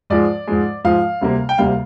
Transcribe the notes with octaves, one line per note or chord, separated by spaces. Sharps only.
G#2 F3 G#3 D5
G#2 F3 G#3
G#2 F3 G#3 F5
D2 C3 G3 A#3
G5
D2 C3 G3 A#3 F5